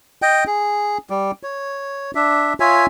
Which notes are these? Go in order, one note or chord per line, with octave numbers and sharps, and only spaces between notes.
D#5 G5
G#4
G3
C#5
D4 E5
F4 C#5 E5 G#5